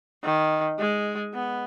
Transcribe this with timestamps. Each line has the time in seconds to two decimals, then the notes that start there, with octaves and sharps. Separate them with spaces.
0.24 D#3
0.79 G#3
1.34 B3